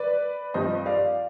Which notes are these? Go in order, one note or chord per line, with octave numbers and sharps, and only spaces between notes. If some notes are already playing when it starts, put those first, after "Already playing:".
Already playing: B4 D5
G2 F3 C4 C5 D#5
D5 F5